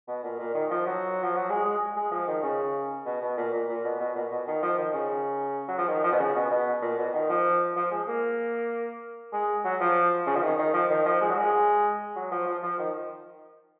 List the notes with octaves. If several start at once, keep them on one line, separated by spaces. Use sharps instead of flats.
B2
A#2
A#2
D#3
F3
F#3
F3
F#3
G#3
G#3
G#3
F3
D#3
C#3
B2
B2
A#2
A#2
A#2
B2
B2
A#2
B2
D#3
F3
D#3
C#3
F#3
F3
D#3
F3
B2
C#3
B2
B2
A#2
B2
D#3
F3
F3
G#3
A#3
G#3
F#3
F3
C#3
F3
D#3
D#3
F3
D#3
F3
G#3
F#3
G#3
F#3
F3
F3
F3
D#3